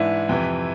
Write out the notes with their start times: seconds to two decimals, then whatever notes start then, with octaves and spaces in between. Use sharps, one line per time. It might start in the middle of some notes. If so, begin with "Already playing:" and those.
Already playing: G#2 E3 G#3 D4 E4 E5
0.29 F2 C3 E3